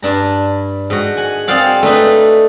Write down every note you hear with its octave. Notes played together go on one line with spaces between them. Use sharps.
G2 D4 A#5
G#2 F#4
F#5 G#5
C4 G#4 C5 D5 F5 F#5
A3 D4 D#4 B4